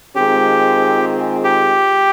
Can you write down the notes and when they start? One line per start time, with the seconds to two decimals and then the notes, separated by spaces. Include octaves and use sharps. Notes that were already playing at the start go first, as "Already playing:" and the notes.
0.15 D#3 G#3 C4 F4 G4 G#4
1.44 G4